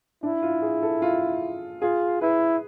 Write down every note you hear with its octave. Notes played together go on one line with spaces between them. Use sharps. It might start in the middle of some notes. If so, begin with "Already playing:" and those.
D4 E4
F4
G#4
A4
F4
F4 G#4
E4 B4